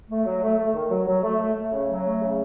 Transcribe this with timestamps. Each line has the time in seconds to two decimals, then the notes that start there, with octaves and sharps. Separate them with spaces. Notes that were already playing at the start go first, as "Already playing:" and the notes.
0.10 A3
0.25 F#3
0.42 A3
0.58 A3
0.74 D#3
0.90 F#3
1.08 F#3
1.23 A3
1.40 A3
1.56 A3
1.73 C#3
1.89 F#3
2.05 A3
2.22 C#3